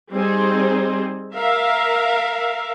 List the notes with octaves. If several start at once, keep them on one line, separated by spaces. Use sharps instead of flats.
G3 C4 D#4 G#4 C5
A#4 E5 F5